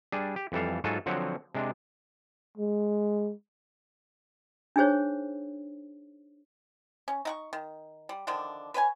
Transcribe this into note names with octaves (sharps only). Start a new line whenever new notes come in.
G3 D4 G#4
G4
F2 E3 G3 A4 F5
G#2 F#3 F4 F#4 A4 G#5
D3 F3 F#3 C4 C#5 F#5
C3 G#3 D4
G#3
D4 D#4 G#4 C5 C#5
C#4
D#4 F#5 C#6
D#3
G3
D3 D#3 F3 D4
B4 C#5 G5 G#5